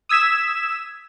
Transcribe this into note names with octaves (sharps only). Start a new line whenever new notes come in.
D#6 E6 G#6 B6 E7